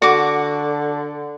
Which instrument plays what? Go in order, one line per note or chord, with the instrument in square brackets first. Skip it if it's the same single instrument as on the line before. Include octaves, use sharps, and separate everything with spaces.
[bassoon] D3 [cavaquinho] F#4 D6